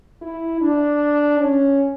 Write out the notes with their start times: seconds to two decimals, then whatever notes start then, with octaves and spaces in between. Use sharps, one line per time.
0.22 E4
0.61 D4
1.40 C#4